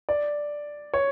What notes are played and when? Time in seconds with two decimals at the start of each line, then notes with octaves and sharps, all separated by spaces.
0.09 D5
0.94 C#5